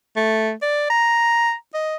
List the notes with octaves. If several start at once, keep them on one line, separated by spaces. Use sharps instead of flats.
A3
D5
A#5
D#5